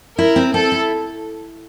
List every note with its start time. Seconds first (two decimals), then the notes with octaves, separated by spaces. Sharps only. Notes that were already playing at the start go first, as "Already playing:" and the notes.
0.18 E4 A#4
0.36 C4
0.54 C4 A4
0.72 E4